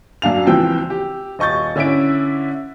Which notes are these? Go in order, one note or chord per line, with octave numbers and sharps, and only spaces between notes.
F#2 D4 F5 F7
C#2 E3 F3 C4 G5 E6
G4
D#1 D#5 C#6 G6 A6
D3 C#4 E4 E5 D7